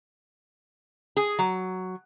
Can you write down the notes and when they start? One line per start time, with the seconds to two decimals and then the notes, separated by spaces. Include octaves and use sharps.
1.17 G#4
1.39 F#3